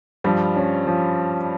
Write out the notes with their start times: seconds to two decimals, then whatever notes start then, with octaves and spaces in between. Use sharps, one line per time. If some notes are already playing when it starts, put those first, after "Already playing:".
0.24 G2 F3 G3
0.56 C#4
0.87 F3